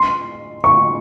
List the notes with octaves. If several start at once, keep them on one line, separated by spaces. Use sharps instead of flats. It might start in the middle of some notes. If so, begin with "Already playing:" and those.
Already playing: C6
C#6